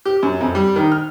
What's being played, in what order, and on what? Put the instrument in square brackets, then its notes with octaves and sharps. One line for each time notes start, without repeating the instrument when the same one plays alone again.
[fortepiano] G4
F#2
F2
G3
D#3
F6